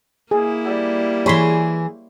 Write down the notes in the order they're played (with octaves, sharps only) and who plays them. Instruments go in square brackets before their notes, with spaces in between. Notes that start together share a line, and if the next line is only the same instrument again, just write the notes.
[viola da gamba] A#3 E4 [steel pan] G#4
[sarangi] G3
[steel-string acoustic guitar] E3 G#4 [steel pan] C#5 B5 C6